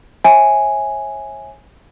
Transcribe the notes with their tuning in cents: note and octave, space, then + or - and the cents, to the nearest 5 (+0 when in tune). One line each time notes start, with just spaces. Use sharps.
C#5 -35 E5 -15 G#5 +0